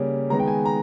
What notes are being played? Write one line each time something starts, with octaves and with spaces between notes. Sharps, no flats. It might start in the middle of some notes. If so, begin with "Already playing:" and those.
Already playing: C#3 G3 A#3 C#4
D#3 G#3 B3 A#5
G5
G#5
A#5